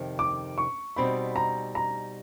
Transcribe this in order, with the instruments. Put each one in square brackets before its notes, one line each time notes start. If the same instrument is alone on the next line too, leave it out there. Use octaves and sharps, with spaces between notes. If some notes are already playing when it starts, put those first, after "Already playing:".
Already playing: [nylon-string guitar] F2 C3 D#3
[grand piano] D6
C#6
[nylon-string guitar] B2 G3 C4 D#4 [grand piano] B5
[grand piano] A#5
A#5